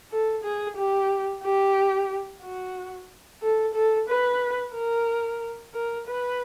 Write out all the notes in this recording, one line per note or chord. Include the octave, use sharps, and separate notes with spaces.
A4
G#4
G4
G4
F#4
A4
A4
B4
A#4
A#4
B4